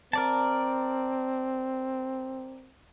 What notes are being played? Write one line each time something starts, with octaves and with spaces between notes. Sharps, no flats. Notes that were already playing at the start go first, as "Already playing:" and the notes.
C4 A#4 D5 A5